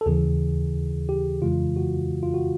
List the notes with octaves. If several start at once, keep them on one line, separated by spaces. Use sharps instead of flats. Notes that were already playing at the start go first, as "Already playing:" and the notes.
A4
D#2 C#3 E3 G#4
G4
F2 C#3 E3 G#3 F4
F#4
F4
F#4